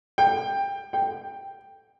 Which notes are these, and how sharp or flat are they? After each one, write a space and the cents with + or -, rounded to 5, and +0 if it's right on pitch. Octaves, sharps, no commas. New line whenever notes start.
G5 +15
G5 +5